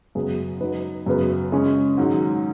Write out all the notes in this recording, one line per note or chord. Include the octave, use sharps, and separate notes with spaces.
F#2 C#3 B3 G#4
F#3 D#4 B4
F#2 C#3 B3 F#4 B4
C#3 G#3 C#4
G#2 D#3 F#3